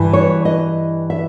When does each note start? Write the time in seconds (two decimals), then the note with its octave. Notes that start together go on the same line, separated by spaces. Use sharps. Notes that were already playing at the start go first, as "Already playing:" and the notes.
Already playing: G2 E3
0.13 C#5
0.45 D#5
1.10 E5